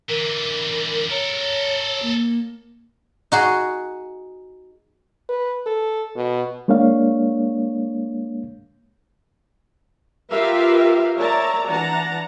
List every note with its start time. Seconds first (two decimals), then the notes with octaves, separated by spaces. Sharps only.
0.09 D3 E3 A#4
1.11 A4 A#4 C#5
2.02 A#3
3.32 D#4 F#4 G#4
5.29 B4
5.66 A4
6.16 B2
6.68 G#3 A#3 D4 C#5 F5
10.30 F4 G4 A#4 B4 E5 F5
11.17 A#4 C#5 D5 E5 A5 A#5
11.67 E3 D4 F#5 A5 A#5